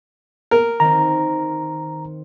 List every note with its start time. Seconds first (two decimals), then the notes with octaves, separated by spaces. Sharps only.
0.51 A#4
0.80 D#3 C4 A#5